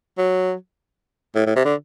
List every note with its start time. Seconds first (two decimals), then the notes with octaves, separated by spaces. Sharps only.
0.18 F#3
1.35 A2
1.46 A2
1.56 C3
1.65 D3